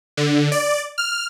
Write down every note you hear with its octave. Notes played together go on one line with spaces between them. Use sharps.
D3
D5
F6